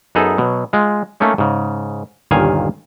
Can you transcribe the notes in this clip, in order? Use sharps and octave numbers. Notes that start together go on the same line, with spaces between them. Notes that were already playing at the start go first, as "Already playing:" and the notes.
F#2 B3 D#4 G#4 A4 E5
B2 F#3
G#3 F4
A3 A#3 C#4 D#4
G#2 C#3
G1 D#2 A#2 D#3 F5 G#5